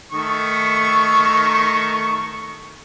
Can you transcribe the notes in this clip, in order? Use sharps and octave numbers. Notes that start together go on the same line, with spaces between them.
D#3 A3 C#6